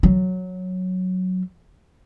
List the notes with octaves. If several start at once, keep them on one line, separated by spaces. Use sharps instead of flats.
F#3